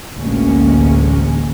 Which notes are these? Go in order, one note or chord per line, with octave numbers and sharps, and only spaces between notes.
A1 D2 G#3 A#3 C#4